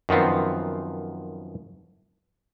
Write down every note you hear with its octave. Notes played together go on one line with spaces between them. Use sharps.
F#2 D#3 F3 B3 C4